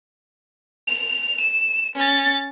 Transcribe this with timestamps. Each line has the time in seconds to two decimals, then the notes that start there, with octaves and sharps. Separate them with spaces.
0.87 F7
1.41 E7
1.96 C#4 A6